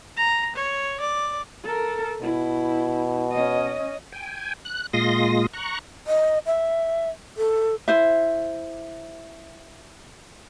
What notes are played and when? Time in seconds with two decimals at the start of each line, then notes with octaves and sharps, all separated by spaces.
0.17 A#5
0.56 C#5
1.00 D5
1.64 A4 A#4
2.22 B2 E4
3.31 C#4 D#5
4.12 G5 G#5
4.65 F#6
4.93 A#2 G#3 F4 C6 D#6 A#6
5.53 A#5 C#6 F#6
6.07 D#5
6.46 E5
7.37 A4
7.88 E4 C5 E5